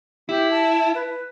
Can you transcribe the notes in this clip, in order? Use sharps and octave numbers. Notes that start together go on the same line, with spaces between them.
E4 G4
A5
B4